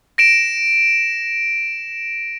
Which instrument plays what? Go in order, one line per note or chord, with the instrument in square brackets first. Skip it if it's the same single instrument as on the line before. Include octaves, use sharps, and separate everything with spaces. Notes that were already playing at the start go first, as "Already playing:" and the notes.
[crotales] A#6 D7 E7